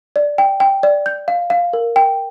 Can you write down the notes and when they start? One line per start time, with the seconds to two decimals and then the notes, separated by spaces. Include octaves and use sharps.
0.16 D5
0.38 G5
0.60 G5
0.83 D5
1.06 G6
1.28 F5
1.50 F5
1.73 A#4
1.96 G5